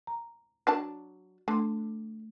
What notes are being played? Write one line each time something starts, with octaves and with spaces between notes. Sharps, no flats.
A#5
F#3 D4 A5
D3 A3 C6